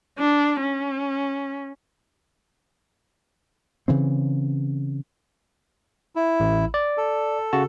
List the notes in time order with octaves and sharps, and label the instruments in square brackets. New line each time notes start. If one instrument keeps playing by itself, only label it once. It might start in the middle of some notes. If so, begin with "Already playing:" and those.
[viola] D4
C#4
[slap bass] C#3 E3 C4
[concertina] E4
[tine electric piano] A1
D5
[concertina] A4
[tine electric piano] C#3 F#4 A5